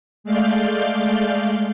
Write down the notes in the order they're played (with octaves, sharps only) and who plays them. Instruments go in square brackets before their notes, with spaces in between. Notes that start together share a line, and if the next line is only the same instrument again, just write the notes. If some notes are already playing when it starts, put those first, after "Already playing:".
[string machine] G#3 A3 D5 F5 G6